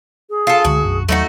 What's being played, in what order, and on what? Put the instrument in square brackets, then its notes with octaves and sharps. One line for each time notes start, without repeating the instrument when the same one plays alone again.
[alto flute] G#4
[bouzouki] F4 A4
[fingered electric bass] C#2 D3 G#3 [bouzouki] F#4
[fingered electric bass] B1 F#2 D4
[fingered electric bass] D#2 F#3 [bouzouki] A3 D#4 F#4